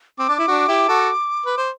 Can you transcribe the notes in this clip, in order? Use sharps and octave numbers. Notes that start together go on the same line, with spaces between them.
C4 D6
D4
E4
D4 F#4
E4 G4
F#4 A4
B4
C5